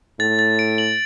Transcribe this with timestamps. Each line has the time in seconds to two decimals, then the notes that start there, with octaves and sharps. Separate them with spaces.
0.20 A2 A6
0.39 A6
0.59 D7
0.78 F#7